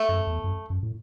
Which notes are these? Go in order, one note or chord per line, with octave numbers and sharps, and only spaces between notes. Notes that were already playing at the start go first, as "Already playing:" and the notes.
Already playing: A3
F#2
E2
F#2
F#2
A2